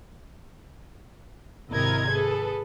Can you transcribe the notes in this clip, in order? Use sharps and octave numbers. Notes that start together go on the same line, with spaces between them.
G#1 C3 E4 A#4 D#5 G#6
G#4 A4 B4